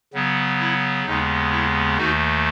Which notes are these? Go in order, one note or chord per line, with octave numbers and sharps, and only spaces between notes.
C#3 F#3 B3
E4
D#2 C#3 G#3 B3 D#4
E4
D#2 D#3 A3 D#4 F#4